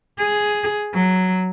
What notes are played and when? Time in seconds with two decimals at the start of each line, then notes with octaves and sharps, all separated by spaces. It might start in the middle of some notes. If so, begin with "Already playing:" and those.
0.18 G#4
0.93 F#3